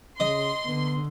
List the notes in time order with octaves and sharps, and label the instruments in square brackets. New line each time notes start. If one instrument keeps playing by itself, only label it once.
[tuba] C#3 [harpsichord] D#5 [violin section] C6
[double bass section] D3 [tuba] B3